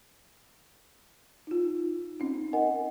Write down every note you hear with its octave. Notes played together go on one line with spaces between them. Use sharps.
D#4 F4
C4 C#4 D#4
A#4 D#5 F#5 G#5